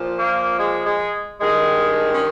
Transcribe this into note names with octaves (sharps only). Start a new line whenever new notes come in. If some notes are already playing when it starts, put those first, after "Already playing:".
Already playing: A#2 F3
A#3
G#3
G#3
G2 D#3 G#3
C#4